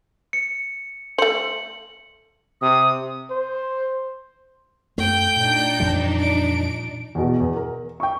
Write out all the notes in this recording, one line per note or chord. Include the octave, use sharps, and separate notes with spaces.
C#7
A3 C5 C#7 F#7
C3 D#6
C5
F#2 A3 G5 G6
A#2 D4 D#4
F2 E3 G3
D7
E2 B2
E2
A#4
G5 C#6